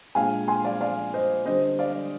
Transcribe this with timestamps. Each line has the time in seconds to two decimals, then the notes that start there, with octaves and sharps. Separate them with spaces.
0.15 A#2 G#3 D4 F5 G#5
0.48 G#5 C6
0.64 D5 F5
0.80 D5 F5
1.14 C5 D#5
1.46 D3 G3 D4 C5 D#5
1.79 D5 F5